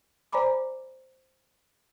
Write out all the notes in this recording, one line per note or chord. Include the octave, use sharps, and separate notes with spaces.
C5 D5 G#5 A#5 B5 D6